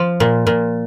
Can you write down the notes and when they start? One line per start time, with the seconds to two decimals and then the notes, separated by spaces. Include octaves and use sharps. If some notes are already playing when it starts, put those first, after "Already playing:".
Already playing: F3
0.20 A#2
0.47 A#2